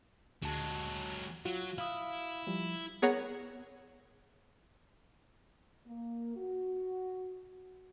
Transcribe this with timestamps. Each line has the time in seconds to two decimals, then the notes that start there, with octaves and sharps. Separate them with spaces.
0.42 D2 F#3 G#3 A5
1.45 F#3 F4 F#4
1.78 E4 F5 D#6
2.47 F3 G3
3.02 B3 G#4 A#4 C#5 F#5 A#5
5.86 A#3
6.37 F#4